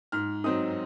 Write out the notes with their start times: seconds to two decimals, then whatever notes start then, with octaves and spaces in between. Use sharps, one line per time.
0.12 G#2 F6
0.44 F#3 C4 D#4 D#6